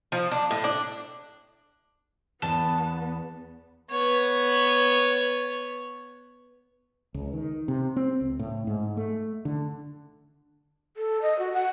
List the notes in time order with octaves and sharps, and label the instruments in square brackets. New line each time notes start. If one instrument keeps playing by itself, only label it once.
[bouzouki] F3
D4
A2
D4
[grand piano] E2 E7 [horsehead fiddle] B3 [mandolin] A5
[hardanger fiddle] B3 C#5
[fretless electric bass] C#2
D#3
C3
C4
C#2
A2
G#2
A3
D3
[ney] A4
D#5
F#4
F#5